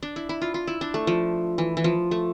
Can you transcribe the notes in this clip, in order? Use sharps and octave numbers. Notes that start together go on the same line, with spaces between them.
D4
E4
E4
F4
F4
E4
D4
A3
F3
E3
E3
F3
A3